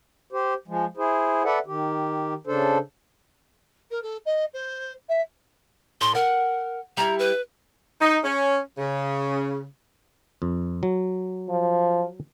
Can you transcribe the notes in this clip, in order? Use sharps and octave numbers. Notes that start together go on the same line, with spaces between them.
G4 C5
F3 G#3
E4 G#4 C5
A4 B4 D5 E5 F#5
D#3 G4
C#3 D4 A4 C5
A#4
A4
D#5
C5
E5
A2 C6
A#4 F#5
G3 E4 A#5
B4
D#4
C#4
C#3
F2
F#3
F3